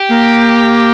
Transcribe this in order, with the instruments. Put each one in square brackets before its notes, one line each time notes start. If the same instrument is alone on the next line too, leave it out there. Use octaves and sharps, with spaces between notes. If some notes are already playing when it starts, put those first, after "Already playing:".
Already playing: [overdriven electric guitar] G4
[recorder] A#3